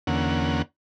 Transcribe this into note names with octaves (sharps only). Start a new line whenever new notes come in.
E2 D3 A#3 C#4 F#5